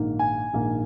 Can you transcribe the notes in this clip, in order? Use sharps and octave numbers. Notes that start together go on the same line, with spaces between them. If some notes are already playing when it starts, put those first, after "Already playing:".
Already playing: A#1 G#2 D#3 A#3
G#5
A#1 G#2 D#3 A#3